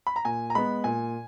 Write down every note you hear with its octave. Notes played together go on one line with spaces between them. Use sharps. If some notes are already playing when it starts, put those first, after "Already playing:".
B5
A#5
A#2 G#5
A#5
G#3 B3 B5
A#2 G#5